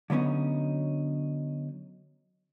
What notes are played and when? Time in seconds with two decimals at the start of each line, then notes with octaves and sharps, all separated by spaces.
0.10 D3 F#3 B3 C#4 D#4